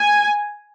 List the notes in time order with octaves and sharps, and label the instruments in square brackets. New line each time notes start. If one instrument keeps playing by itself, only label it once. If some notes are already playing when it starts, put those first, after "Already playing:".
Already playing: [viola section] G#5